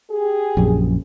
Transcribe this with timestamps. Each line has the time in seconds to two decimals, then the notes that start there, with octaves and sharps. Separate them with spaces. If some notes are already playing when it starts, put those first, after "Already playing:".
0.11 G4 G#4
0.57 A#1 F#2